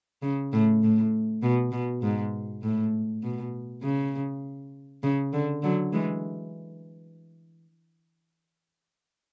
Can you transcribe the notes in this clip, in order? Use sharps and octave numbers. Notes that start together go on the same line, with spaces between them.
C#3
A2
A2
B2
B2
G#2
A2
B2
C#3
C#3
D3
D3 F#3
E3 G#3